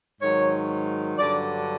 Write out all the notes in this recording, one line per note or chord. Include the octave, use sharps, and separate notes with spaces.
G#2 D#3 F#3 C#5
G2 D3 F#3 D5